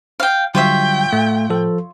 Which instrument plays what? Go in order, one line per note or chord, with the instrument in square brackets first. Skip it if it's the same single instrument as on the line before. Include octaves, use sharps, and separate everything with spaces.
[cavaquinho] F5 G5
[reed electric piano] D3 F#3 G3 [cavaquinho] F4 C#5 E5 [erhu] G5
[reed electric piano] A2 [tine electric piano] A3
[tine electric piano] F3 A4